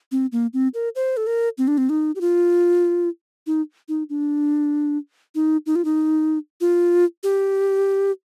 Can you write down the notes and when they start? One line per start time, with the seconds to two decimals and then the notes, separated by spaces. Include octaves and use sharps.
0.12 C4
0.32 A#3
0.53 C4
0.74 A#4
0.96 C5
1.17 A4
1.27 A#4
1.58 C4
1.68 D4
1.78 C4
1.89 D#4
2.16 G4
2.21 F4
3.47 D#4
3.89 D#4
4.10 D4
5.35 D#4
5.66 D#4
5.76 F4
5.85 D#4
6.61 F4
7.23 G4